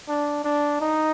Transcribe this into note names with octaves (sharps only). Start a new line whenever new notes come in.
D4
D4
D#4